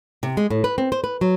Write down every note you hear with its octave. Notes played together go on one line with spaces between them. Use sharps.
C3
G#3
A2
B4
C4
C5
B4
F#3